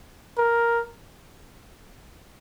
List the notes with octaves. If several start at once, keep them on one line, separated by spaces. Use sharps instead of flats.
A#4